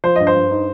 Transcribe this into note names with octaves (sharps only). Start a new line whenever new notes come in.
F3 C5
G2 D#5
C5
G2
D#4